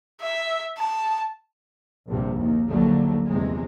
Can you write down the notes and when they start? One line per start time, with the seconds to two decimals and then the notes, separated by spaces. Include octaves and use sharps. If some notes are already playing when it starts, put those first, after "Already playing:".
0.21 E5
0.78 A5
2.07 A#1 G2 C3
2.36 D#2
2.68 A#1 D#2 D3 F#3 G3 A3
3.28 G1 E2 C3 G#3